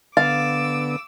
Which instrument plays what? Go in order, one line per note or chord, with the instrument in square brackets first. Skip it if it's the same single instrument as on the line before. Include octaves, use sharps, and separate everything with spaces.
[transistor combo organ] D3 B3 [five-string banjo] F5 [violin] D6 E6 [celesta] A6